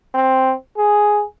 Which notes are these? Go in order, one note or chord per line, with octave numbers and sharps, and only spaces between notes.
C4
G#4